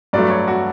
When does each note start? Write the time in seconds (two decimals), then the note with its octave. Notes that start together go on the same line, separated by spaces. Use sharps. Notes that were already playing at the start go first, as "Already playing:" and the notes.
0.13 G2 F#3 A3 D5
0.30 C#5
0.48 F#4